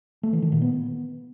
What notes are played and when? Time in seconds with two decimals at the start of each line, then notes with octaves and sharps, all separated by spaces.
0.23 A3
0.33 E3
0.42 D#3
0.52 A#2
0.61 B3